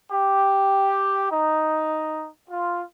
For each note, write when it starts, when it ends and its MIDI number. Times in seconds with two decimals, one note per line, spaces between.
0.11 1.29 67
1.31 2.27 63
2.50 2.83 65